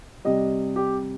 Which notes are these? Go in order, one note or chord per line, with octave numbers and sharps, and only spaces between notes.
C3 G3 D#5
G4